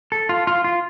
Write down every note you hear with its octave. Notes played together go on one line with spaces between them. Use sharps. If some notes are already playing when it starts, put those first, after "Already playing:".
A4
F4
F4
F4